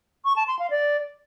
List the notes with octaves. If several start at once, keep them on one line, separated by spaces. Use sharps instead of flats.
C#6
A5
C6
F5
D5